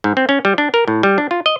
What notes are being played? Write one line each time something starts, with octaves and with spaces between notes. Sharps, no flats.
G#2
C4
C#4
G3
D4
A#4
A2
G3
D4
F4
D#5